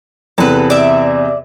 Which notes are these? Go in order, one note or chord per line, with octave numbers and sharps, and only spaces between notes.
E2 C3 B3 A4 B4
D5 E5